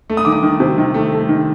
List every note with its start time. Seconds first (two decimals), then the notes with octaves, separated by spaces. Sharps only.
0.10 A3
0.17 D#6
0.25 D#3 D6
0.32 D#6
0.43 D#3
0.60 C3
0.78 D#3
0.94 A3
1.12 A3
1.29 D#3